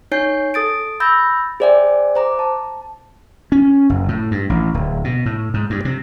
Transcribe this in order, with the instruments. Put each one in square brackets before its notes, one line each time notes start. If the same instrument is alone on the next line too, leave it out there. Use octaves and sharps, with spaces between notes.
[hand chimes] D#4 C#5 G#5 G6 C7
A4 D#6 A6 D7
B5 E6 G6 A6 A#6
G#4 C5 D5 E5 G5 G#5
C5 A#5 D6
A5
[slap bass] C#4
F#1
A2
G2
A1
D1
B2
A2
G#2
G2
C3